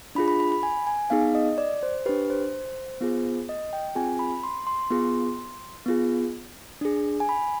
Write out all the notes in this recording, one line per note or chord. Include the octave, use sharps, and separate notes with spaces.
D4 F4 G#4 B5
B5
B5
B5
G#5
G#5
B3 D#4 G#4 F5
D#5
D5
C5
D4 G4 B4
C5
B3 F4 G#4
D#5
G5
C4 F4 G#4 G#5
B5
C6
C6
B3 F4 G#4
B3 F4 G#4
D4 G#4
G#5
B5